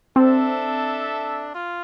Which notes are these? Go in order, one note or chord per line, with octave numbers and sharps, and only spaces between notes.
C4 D4 A4 E5
F4